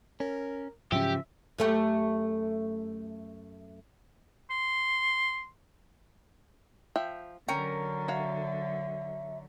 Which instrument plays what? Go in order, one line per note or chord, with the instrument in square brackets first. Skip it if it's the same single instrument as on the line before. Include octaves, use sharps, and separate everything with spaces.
[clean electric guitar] C#4 [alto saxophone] A#4
[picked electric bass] G#2 F#3 C#4 [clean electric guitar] C#3 F3 [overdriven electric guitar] G4 [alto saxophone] E5
[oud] F#2 A3 G4
[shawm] C6
[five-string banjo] F3 E5 G5
[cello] D3 F#3 [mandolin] C#4 A#4 [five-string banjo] G5
[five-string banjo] F#4 C#5 F5 [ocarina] E5